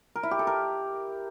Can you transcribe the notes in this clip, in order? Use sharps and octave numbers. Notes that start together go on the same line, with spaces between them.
A#4
E4
G4
A4
A#4